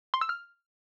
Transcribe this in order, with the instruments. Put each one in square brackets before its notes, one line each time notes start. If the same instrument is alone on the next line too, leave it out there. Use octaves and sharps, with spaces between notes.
[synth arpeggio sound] C6
E6
F6